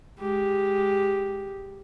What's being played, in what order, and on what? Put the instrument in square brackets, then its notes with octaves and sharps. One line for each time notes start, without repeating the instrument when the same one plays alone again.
[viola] G#3 G4